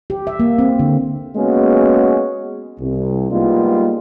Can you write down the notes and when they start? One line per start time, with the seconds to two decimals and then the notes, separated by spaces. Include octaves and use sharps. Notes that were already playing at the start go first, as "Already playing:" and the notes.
0.10 G4
0.27 E5
0.40 A#3
0.59 C4
0.79 D3
1.36 G#3 A#3 B3 C#4 F#4 G#4
2.80 C2
3.32 G3 G#3 A#3 B3 D#4 F4